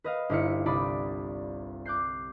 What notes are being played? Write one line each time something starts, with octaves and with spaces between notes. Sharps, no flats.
B4 D#5 F5
G1 A#3 D#4 E4 F5 C#7
C2 D5 B5 D#6
D6 F#6 G6 C7